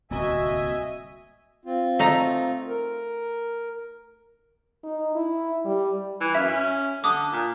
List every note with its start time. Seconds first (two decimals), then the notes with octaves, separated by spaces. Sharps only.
0.11 D1 C2 A#3 F#4 D#5 E5 G#5
1.65 C4 F4
1.99 A3 D#4 A#5
2.68 A#4
4.84 D#4
5.15 E4
5.65 G3
6.21 E3
6.35 F#2 E5
6.48 C#4
7.04 D3 D6 D#6
7.32 A#2